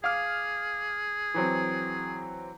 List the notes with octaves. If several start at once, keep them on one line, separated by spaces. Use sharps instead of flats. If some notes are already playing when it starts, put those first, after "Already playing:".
G#4 F5 D6 F6
E3 F#3 C4